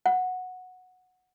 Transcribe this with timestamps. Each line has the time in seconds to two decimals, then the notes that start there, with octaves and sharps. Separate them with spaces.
0.06 F#5